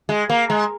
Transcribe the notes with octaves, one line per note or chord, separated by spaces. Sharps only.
G#3
A#3
G#3